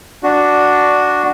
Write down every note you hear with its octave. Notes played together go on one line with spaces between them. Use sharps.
D4 F#4